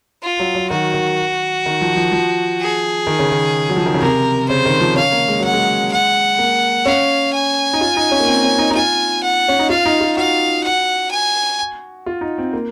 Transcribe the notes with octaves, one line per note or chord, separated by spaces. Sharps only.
F4
F#3
F#3
D#3 F#4
D#3
D#3
F3
F3
F3
G#4
D#3
C#3
D#3
F#3
F3
D#3
C#3
C3 A#4
C#3 C5
D#3
F3
C#4 F5
A#3
G#3
F#3 F#5
G#3
F#5
A#3
C#4 F5
G#5
D#4
F4
D#4
C#4
A#3
C4
C#4
D#4
D#4
F4 G#5
F#5
C#4
D#4
F4 F5
D#4
F4
F#4 F5
F#5
G#5
F4
D#4
C4
A#3